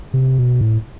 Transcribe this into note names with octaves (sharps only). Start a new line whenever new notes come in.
C3
B2
A2